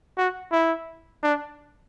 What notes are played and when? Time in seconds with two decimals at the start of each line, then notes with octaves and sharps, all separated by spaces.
0.18 F#4
0.52 E4
1.23 D4